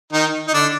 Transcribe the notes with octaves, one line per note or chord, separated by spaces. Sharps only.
D#3 D#4
D#4
D3 D4